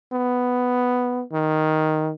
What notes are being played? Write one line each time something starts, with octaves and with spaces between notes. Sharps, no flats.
B3
D#3